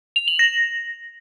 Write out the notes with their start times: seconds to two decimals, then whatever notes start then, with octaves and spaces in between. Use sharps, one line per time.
0.16 F7
0.28 F#7
0.39 A#6